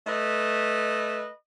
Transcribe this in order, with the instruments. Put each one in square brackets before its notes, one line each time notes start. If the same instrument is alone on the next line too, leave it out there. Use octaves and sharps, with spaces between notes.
[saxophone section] A3 B4 D#5